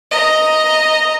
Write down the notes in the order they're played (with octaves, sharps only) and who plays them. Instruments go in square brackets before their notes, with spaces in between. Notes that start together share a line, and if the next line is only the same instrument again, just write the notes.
[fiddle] D#5 A#5